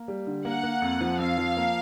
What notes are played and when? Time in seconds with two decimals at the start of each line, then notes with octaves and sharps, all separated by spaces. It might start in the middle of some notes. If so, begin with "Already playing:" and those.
Already playing: A#3
0.08 G3
0.27 D3
0.45 A#3 F#5
0.63 A#3
0.82 F2
1.01 F3
1.19 F2 F5
1.38 F3
1.57 A#3